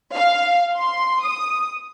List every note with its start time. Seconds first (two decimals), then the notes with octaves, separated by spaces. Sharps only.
0.13 F5
0.76 C6
1.23 D#6